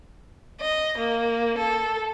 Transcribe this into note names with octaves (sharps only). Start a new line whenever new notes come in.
D#5
A#3
A4